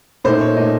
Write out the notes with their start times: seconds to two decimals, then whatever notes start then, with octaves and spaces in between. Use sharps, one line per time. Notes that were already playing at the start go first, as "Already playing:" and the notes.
0.24 A#2 A3 D#4 C5
0.41 C#5
0.57 A#2 A3 D#4 D#5